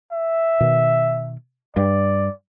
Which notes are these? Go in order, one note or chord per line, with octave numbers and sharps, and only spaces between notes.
E5
B2 D#3
G2 D5